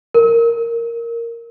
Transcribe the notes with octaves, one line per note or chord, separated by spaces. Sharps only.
A#4